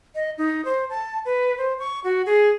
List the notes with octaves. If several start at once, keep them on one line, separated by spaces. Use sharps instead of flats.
D#5
D#4
C5
A5
B4
C5
C#6
F#4
G#4